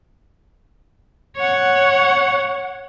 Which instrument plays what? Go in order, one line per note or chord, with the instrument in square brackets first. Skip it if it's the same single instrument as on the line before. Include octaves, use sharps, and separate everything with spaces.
[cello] C#5 F#5